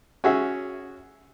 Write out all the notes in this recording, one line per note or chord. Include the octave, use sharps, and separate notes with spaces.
C#4 F#4 G#4 E5